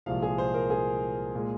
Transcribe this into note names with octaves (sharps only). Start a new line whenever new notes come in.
C2 A#2 F3 G#3 F5
G#4
C5
A#4
G#4
A#2 G#3